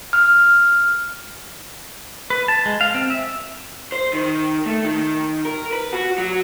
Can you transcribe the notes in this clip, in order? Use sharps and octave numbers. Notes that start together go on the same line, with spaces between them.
F6
B4
A5
G#3
F5
C4
E5
C5
D#3
A3
D#3
A#4
B4
F#4
F#3